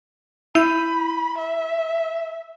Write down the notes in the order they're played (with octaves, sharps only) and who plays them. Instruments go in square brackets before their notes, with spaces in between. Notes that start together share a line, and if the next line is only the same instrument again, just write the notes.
[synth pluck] E4 G6 D#7 [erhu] B5
[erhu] E5